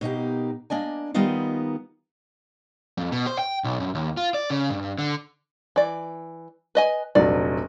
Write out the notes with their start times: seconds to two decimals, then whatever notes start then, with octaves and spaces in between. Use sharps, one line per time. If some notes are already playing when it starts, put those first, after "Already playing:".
0.01 B2 A#3 D#4 G4
0.70 A#3 D4 D#5 G#5
1.14 D#3 G3 A#3 B3 D#4 F4
2.98 F2
3.12 B2
3.27 C5
3.39 G5
3.64 B1
3.80 F#2
3.95 D#2
4.17 F4
4.34 D5
4.50 C#3
4.70 G2
4.98 D3
5.76 E3 D5
6.75 B4 D#5 G#5
7.15 F1 A#1 F#3 D5